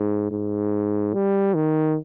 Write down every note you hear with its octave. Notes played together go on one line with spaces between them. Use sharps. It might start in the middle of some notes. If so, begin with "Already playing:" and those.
Already playing: G#2
G#2
G3
D#3